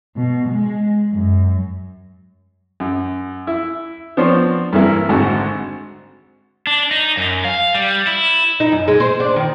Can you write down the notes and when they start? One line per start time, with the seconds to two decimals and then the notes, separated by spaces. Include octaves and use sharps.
0.16 B2
0.48 G#3
1.12 F#2
2.80 F#2
3.47 E4
4.17 F3 B3 C4 D4 C5 C#5
4.73 G2 C3 E3 A#3 E4
5.09 G#1 G#2 D3 C4 F#4 C#6
6.67 D4
6.91 D#4
7.17 F#2
7.45 F5
7.74 G3
8.07 E4
8.60 D#4
8.72 F#2
8.88 G#3
9.00 C5
9.20 D4
9.36 D#3